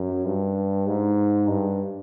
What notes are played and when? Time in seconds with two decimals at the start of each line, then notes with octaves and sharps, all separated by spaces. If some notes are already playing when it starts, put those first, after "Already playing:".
Already playing: F#2
0.25 G2
0.87 G#2
1.49 G2